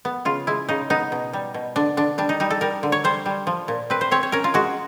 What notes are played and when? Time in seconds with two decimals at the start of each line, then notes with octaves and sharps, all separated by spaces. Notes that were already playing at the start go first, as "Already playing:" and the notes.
0.05 B3
0.25 C#3 F4
0.47 G#3 E4
0.69 C#3 D#4
0.90 B3 D#4
1.12 B2
1.33 G3
1.54 B2
1.76 D3 D4
1.97 D3 D4
2.18 G3 D4
2.29 D#4
2.40 G3 D#4
2.50 A4
2.61 G3 A#4
2.83 D3
2.92 C#5
3.04 G3 C5
3.26 G3
3.47 F3
3.68 A#2
3.90 C4 B4
4.01 C5
4.11 C4 C#5
4.23 C#5
4.32 C#4 A#4
4.44 F4
4.54 G#3 F#4